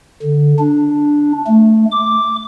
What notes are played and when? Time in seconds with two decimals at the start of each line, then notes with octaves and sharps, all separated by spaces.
0.22 D3
0.59 D4
1.47 A3
1.92 D6